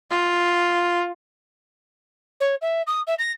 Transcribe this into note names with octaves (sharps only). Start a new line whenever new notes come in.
F4
C#5
E5
D#6
E5
A#6